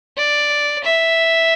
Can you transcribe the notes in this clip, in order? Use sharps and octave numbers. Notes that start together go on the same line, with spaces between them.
D5
E5